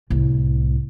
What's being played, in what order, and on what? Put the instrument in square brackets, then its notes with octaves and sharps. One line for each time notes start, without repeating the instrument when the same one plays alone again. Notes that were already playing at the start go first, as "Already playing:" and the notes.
[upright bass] C2 A2